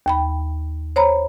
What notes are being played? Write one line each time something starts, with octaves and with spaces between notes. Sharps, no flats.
D#2 G5 B5
C5 C#5 A#5 B5